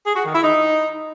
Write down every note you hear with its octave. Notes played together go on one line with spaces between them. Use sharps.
G#4
F#4
D#3
E4
D#4